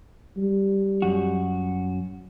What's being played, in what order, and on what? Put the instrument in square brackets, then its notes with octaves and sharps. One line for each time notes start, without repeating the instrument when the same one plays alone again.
[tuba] G3
[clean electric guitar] F#2 F#4